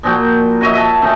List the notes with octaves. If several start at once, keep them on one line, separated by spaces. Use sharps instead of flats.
A#2 F3 F#4 G5
F#4 C#5 D#5 E5
E5 A5
D#3 A3 C#4